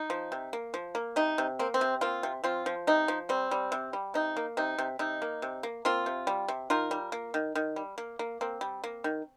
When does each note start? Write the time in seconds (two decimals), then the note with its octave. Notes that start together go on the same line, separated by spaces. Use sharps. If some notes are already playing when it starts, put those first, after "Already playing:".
Already playing: D#4
0.10 F3
0.32 C3
0.53 A#3
0.74 F3
0.95 A#3
1.16 C3 D#4
1.38 C3
1.59 A#3 C4
1.74 C4
1.81 C3
2.01 A#3 C4 F4
2.23 C3
2.44 F3 C4 F4
2.66 F3
2.87 C3 D#4
3.08 F3
3.29 G3 C4
3.51 G3
3.72 C3
3.93 G3
4.14 C3 D#4
4.37 A#3
4.57 C3 D#4
4.78 C3
4.99 C3 D#4
5.22 A#3
5.42 C3
5.63 A#3
5.85 A#3 C4 F4
6.06 C3
6.27 G3
6.48 C3
6.70 D#3 F4 A#4
6.91 G3
7.12 A#3
7.34 D#3
7.55 D#3
7.76 G3
7.98 A#3
8.19 A#3
8.41 A#3 C4
8.61 G3
8.84 A#3
9.04 D#3